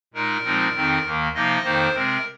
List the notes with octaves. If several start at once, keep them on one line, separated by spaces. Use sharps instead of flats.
A#2 G#3 D#4 A#4
A#2 F3 G#3 C4 D#4
F2 D#3 C4 D#4
D#2 D#3 A#3
C3 F3 A#3 D#4 D#5
F2 D#3 A#3 D#4 C5
C3 G#3 C4 A#4